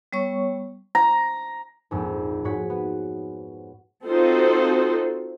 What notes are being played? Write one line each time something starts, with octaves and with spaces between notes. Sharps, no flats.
G3 B3 C#5 C#6
A#5
A#1 F2 G#2
G#2 F#4 C#5 B6
B3
C4 D#4 F4 F#4 A4 C5